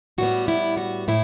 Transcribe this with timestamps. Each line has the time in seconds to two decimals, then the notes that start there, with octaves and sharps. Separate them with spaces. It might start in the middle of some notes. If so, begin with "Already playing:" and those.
0.18 A2 G3 B3 F#4
0.48 E4
0.77 F#4
1.08 A2 E4